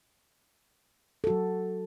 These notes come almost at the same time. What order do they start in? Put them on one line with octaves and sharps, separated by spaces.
A4 F#4 F#3